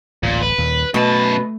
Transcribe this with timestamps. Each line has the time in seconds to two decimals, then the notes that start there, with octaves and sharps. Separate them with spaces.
0.23 D1 A1 A#2
0.42 B4
0.58 D#2 A#2
0.94 F#2 B2 A3 B4 A5